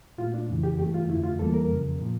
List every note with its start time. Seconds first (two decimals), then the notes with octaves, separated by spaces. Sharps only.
0.18 A#2 A3 F4
0.34 D4
0.49 F2 C#3 E3
0.63 G4
0.79 G2 E3 A3 G4
0.94 F4
1.09 F2 D3 A3 E4
1.24 F4
1.39 E2 E3 G3 A#3 A4
1.54 A#4
1.69 F2 C#3 F3
1.99 A#2 F3